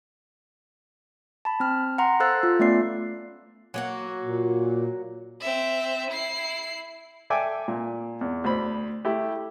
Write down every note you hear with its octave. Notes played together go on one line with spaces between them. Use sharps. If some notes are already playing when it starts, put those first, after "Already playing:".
A5 B5
C4 F6
F#5 A#5 C6
A4 C5 F5 E6 F#6 A6
F4
A3 B3 C#4 D5 C7
F#3 A#3 F#4
A#2
C4 E5
E4 C7
A4 D5 E5 G5 G#5 D6
A#2
E2
D2 C5 B5
A3 E4 G4